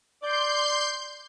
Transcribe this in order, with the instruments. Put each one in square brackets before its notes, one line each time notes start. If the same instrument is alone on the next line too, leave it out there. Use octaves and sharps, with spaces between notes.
[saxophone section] D5 [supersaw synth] C6 G6